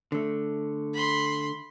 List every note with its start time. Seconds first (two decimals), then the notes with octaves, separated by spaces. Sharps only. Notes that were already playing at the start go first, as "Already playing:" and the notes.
0.12 D3 A3
0.94 B5 C6